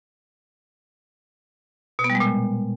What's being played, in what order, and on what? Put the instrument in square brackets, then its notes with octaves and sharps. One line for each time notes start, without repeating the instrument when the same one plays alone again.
[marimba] B2
B3
G3
G#3
A#2